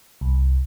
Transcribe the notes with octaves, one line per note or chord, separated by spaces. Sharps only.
C2